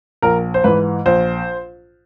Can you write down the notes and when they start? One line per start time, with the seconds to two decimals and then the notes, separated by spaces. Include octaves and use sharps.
0.22 A#1 A#4
0.54 C5
0.64 G#2 E3 B4
1.06 A#1 C5